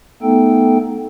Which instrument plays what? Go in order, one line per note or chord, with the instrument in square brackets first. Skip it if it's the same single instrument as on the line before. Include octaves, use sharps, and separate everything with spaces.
[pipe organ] A3 B3 D#4 A4 G5